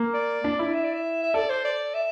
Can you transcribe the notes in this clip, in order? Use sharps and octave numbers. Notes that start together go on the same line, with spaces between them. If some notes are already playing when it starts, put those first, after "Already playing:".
Already playing: A#3
D5
D4
E4
E5
D5
E5
E5
A4 D5
C5
D5
E5